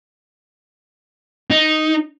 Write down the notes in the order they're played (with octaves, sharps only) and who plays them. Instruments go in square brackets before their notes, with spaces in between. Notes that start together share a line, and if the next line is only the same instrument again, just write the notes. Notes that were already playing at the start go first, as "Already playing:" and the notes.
[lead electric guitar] D#4